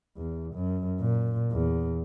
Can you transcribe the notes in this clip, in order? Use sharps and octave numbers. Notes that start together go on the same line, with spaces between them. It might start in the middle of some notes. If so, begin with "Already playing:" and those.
E2
F#2
A#2
E2